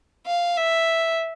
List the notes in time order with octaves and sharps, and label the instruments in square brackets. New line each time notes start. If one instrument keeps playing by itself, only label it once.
[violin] F5
E5